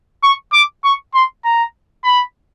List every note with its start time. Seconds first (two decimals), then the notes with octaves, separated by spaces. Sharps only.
0.23 C#6
0.53 D6
0.84 C#6
1.14 C6
1.45 A#5
2.04 B5